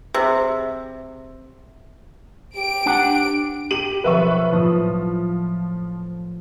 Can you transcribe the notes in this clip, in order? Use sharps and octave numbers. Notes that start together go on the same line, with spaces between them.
C3 G#4 E6
G4 D7
D4 F#5
G4 D#7 F#7
B1 F3 B4 E5 C#6
A2 F3 D#6